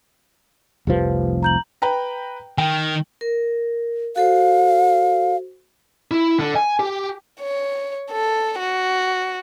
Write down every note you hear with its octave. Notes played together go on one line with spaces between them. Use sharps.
F1 C2 F3 G4 B4
A#5 G6 F#7
B4 G5 A#5
D#3 G5
A#4
F#4 A4 C5 F5
E4
D3
G#5
G4
C#5
A4
F#4